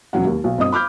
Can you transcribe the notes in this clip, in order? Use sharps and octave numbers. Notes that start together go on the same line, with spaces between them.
E1 F#3 C#4 F#5
D#2
B1
G1 C4 D#5 D#6
B5 D6 F6 G6